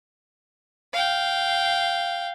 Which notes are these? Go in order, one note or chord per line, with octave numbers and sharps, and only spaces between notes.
F5 G5